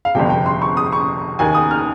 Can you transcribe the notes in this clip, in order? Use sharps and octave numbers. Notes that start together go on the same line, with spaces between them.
F5
G1 F2 C3 G5
G5
C6
C#6
D#6
C#6
D#2 D#3 A#3 G#5
D#6
F6